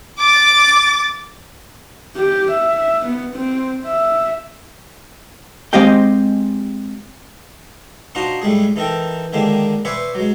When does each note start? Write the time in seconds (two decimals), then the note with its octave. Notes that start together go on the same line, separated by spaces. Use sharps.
0.19 D6 A6
2.17 G4
2.51 E5
3.05 B3
3.35 C4
3.86 E5
5.73 G#3 C4 G4 D#5 F5 G5
8.15 D4 D#4 F4 F#4 C5 D#5
8.42 A2 G3 G#3 G#4
8.76 E3 D#4 A4 A#4 G5
9.33 D3 D#3 G#3 A#3 D4 G4
9.85 B4 C5 D5 E5 G#5 C#6
10.15 F#3 G#3